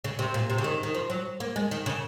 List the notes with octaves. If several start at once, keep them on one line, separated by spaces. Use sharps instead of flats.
C#3
C3
A#2
C3
C#3
D#3
D#3
F3
F#3
A#3
G#3
D#3
C#3